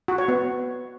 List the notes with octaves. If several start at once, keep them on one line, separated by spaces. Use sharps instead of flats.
F#4
C#5
B3